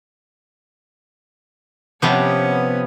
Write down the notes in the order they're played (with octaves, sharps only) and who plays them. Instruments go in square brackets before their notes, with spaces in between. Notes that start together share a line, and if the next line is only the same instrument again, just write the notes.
[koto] C3 F3 G4 [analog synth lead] B3 [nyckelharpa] C#4 C#5